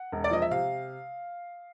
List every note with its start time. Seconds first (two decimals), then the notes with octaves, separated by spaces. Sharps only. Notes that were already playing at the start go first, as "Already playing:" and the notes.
Already playing: F#5
0.12 E1
0.24 D5
0.31 F3 D#5
0.42 E5
0.51 C3 F5